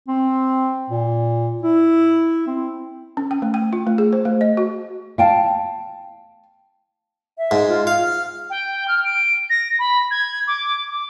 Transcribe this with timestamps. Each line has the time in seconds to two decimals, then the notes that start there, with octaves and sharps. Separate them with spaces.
0.08 C4
0.90 A#2
1.62 E4
2.47 C4
3.17 C#4
3.31 G5
3.42 A3
3.54 G5
3.73 F4
3.87 A3
3.98 G#4
4.13 C5
4.25 A3
4.41 D#5
4.57 F#4
5.18 F5 G5 A5
7.38 E5
7.51 G#2
7.69 F4
7.87 F5
8.03 F6
8.50 G5
8.88 F6
9.04 D7
9.50 A#6
9.79 B5
10.11 G#6
10.47 D6
10.90 D6